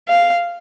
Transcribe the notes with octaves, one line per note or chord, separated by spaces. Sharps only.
F5